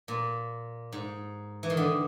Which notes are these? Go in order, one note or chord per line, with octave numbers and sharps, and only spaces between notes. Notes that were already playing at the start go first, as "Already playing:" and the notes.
A#2
G#2
E3
D#3
D3